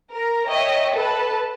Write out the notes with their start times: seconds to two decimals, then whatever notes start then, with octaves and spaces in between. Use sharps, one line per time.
0.10 A#4 A#5
0.47 C#5 D#5 E5 G5
0.94 A4 B4 A5